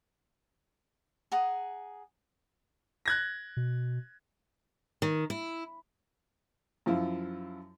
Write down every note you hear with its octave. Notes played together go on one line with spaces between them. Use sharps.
G#4 F#5 A#5 D#6
F#6 G#6 A#6
B2
D#3
E4
F#2 F3 E4 F4